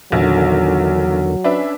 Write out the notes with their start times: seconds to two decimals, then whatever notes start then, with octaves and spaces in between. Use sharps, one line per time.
0.12 A#1 E2 D3 D#3 F#3
1.44 C#4 D4 B4 E5